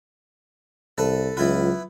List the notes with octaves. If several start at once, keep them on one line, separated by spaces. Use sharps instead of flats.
C2 A4 B4
C#2 F#3 B3 E4 F4 B4